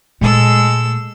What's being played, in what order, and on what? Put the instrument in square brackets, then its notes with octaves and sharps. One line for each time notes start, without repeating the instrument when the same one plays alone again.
[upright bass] A#2 A3 [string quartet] G#3 A4 E6